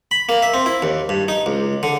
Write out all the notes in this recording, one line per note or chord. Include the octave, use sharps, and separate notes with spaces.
B5
A#3
E5
C4
E4
D#2
G2
D#4
C#2
D3